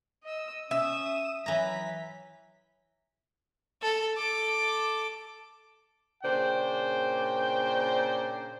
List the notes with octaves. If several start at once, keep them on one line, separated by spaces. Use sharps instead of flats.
D#5 E6
C#4 E5 D#6 E7
E3 F#3 A#5 B6
A4
A4 D6
A#2 C#3 D4 C5 G5